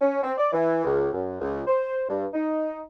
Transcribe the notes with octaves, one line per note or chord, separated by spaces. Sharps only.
C#4
C4
D5
E3
C#2
F#2
C#2
C5
G2
D#4